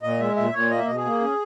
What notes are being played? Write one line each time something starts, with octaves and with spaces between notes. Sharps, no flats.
A#2 D#5
G#3 E5
A#2 E5
A#2 C#5
A#3 D#5
E5
B2 D#5
G#4
A#3
C#4